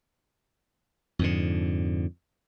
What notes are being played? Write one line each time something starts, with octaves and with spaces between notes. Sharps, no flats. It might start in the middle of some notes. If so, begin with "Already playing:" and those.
F2 G#2 D3